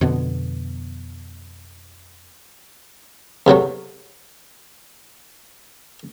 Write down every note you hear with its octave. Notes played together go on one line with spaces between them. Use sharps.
F2 B2 D3 B3
E2 C3 F#3 A3